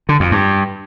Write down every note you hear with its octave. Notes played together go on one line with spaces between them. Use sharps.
D3
F2
G2